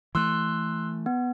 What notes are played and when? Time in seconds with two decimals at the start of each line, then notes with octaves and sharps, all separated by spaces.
0.15 E3 A3 C6 E6 F#6
1.06 B3